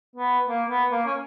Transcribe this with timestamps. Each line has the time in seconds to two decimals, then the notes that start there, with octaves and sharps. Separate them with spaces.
0.16 B3
0.48 A#3
0.70 B3
0.91 A#3
1.06 C#4